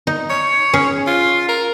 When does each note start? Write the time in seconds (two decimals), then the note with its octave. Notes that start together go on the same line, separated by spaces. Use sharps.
0.07 D#4
0.30 C#5
0.73 C#4 G#4
1.07 F4
1.48 A#4